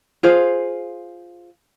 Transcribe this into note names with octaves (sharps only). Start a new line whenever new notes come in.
F4 G#4 C5 F5